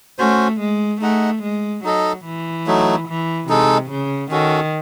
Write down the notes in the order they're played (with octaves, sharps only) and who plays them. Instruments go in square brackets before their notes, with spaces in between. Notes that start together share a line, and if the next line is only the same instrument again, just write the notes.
[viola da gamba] A3 [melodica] C#4 F#4 C5
[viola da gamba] G#3
[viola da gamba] A3 [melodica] D#4 G#4 D#5 F#5
[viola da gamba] G#3
[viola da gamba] F#3 [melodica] D#4 A4 D#5
[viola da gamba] E3
[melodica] F#3 A3 D#4
[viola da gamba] E3
[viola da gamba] C3 [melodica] G#3 D#4 A4
[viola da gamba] C#3
[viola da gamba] D#3 [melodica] C#4 F#4 A4